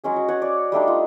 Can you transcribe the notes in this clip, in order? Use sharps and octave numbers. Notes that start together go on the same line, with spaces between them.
F#3 G#3 C#4 G#4
F#3
C#5 F#5 G#5
D5
G3 A3 D4 D#4
F4